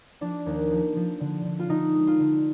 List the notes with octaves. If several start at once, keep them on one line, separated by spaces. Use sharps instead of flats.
F3 D4
D#2
F3
F3
D3
D3
F4
D3 D#4
G#3
F4
D3